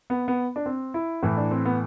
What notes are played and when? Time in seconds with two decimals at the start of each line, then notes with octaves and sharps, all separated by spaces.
0.10 B3
0.28 B3
0.56 D4
0.66 C4
0.94 E4
1.23 A2 E3 E4
1.37 D4
1.51 C4
1.65 B3